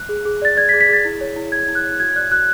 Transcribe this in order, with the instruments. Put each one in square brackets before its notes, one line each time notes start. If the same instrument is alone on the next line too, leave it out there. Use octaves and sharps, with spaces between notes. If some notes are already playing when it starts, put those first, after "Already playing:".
Already playing: [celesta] F#6
G#4
G#4
D5 A6
D5 G#6
B6
G#4
B6
G#4 A6
E4
C#5
E4
G#4 G#6
E4
F#6
C#5
F#4 G#6
D5 F#6
F#4 F#6